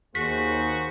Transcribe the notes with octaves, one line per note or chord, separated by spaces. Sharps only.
D#2 A#3 F#4 G#4 C5 B6